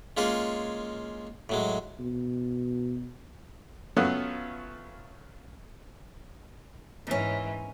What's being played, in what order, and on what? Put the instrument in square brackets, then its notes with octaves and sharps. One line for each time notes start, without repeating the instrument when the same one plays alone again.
[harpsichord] G#3 A#3 C#4 F4 G#4
A2 F#3 G#3
[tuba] B2
[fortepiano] F#3 A3 B3 C#4 F4 F#6
[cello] G#2 E3 [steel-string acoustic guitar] C#4 A#4